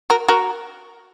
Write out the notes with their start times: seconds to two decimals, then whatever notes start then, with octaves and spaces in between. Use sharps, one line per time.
0.10 F#4 A#4
0.28 F#4 A#4